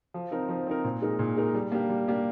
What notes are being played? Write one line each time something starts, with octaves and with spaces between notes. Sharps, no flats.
F3
C4 D#4 A#4
F3
C4 D#4 A#4
A#2
G#3 D#4 A#4
A#2
G#3 D#4 A#4
G3
A#3 D4 G4
G3
A#3 D4 G4